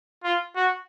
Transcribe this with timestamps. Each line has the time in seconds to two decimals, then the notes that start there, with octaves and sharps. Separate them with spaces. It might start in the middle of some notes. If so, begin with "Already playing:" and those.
0.24 F4
0.56 F#4